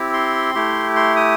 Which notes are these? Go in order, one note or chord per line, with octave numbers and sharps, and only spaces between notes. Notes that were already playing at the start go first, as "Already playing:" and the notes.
Already playing: C4 E4 G4
C6
A3 E4 G4
C6
D#6